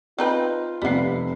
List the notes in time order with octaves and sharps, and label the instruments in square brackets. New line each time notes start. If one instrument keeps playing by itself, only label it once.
[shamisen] C4 D#4 B4 [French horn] F4
[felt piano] F1 C3 C7 [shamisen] G3 B3